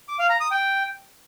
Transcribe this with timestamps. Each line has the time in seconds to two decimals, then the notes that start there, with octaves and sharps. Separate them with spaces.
0.09 D6
0.19 F5
0.30 A#5
0.40 D#6
0.51 G5